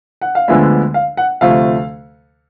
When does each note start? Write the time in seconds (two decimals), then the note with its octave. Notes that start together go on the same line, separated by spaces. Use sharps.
0.21 F#5
0.35 F5
0.48 D2 D3 F3 G#3 B3 E5
0.94 F5
1.17 F#5
1.41 D2 C3 F3 A3 F5